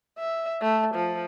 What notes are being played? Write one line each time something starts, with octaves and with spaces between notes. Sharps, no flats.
E5
A3
F3